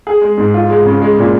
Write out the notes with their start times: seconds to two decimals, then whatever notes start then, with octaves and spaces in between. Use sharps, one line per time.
0.07 G#4
0.22 G#3
0.37 G#2
0.54 F4
0.70 G#3
0.86 C#3
1.02 G#3
1.18 A#2